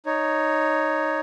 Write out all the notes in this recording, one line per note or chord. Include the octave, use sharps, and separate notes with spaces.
D#4 C#5